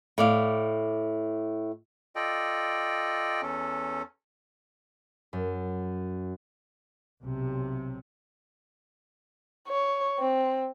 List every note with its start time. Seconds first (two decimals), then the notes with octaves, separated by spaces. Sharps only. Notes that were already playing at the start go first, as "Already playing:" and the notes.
0.18 A2 D5 F5
2.16 F4 A4 D5 D#5 G5
3.42 E2 C#4 A4
5.33 F#2
7.22 B1 C3
9.68 C#5
10.19 C4